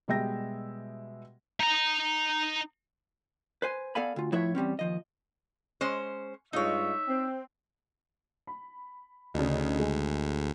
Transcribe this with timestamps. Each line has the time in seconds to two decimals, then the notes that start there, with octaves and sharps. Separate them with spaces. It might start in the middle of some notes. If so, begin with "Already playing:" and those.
0.08 B2 G3 G#3 E5 G5 A#6
1.60 D#4 A#5
3.62 B4 C5 G#5
3.95 B3 A4 D5 F5 G#5 B5
4.16 D2 F4
4.32 A2 F3 E4 B4 C#5 E5
4.55 E2 G3 C4 C#4
4.79 D#2 F3 D#5
5.81 G#3 C#4 C5
6.53 G2 G#3 D#4 F4 C#5 E5
7.07 C4
8.47 B5
9.34 D2 C#3 D4 D#4
9.79 G#3